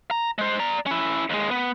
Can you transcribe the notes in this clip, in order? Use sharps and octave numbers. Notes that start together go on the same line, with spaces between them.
A#5
G#3 C5
D5 A#5
C#4 E4
D#2 G#3
B3